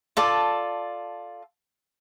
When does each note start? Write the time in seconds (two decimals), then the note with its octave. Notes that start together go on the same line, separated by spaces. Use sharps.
0.17 F4 A4 D5 A5